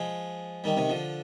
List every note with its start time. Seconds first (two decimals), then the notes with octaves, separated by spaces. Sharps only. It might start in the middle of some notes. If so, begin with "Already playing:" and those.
Already playing: F3 G#3
0.64 D#3 G3
0.77 C3 D#3
0.89 D3 F3